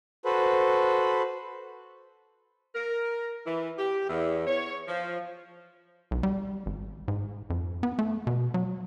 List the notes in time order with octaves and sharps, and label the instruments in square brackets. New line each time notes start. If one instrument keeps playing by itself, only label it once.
[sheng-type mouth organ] F#4 A4 B4 C5
[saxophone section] A#4
E3
G4
E2
C#5
F3
[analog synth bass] B1
G3
G#1
G#2
F2
B3
A3
B2
F#3